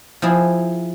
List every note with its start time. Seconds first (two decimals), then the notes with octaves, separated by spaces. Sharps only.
0.22 F3 C4 E4 G#4